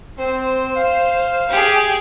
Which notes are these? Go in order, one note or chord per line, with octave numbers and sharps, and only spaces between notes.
C4 C5
F5
G4 G#4